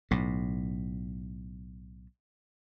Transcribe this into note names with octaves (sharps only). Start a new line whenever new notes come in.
B1 A2